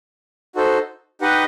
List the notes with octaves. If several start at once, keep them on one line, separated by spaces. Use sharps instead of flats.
D#4 F#4 A4 C5
D#4 G4 B4 D#5 F#5